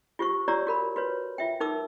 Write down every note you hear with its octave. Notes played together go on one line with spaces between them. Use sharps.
F4 G4 C5 C#6
F4 G4 C#5 D5 A#5 E6
F#4 A#4 B5
F#4 B4 C#5
F4 E5 G5
D#4 A#4 D6 E6